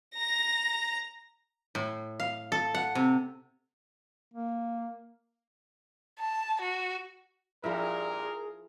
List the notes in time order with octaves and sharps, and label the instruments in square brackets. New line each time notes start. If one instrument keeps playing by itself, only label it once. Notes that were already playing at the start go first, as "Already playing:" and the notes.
[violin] A#5 A#6
[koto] A2
F5
A4
F#5
C3
[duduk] A#3
[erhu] A5
F#4
[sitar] G2 A#2 [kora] F3 E4 E5 [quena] G#4 [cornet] A#4